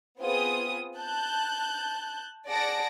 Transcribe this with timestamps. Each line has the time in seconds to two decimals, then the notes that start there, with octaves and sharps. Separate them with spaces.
0.20 B3 C4 F4 G#4 D#6
0.97 A5 F#6 G6
2.47 G#4 D5 F#5 A5 A#6 D7